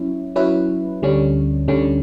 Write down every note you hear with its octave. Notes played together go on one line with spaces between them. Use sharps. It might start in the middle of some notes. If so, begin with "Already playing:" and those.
Already playing: F#3 C#4 E4
F#3 C#4 E4 B4
D2 D3 G3 C#4
D2 D3 G3 C#4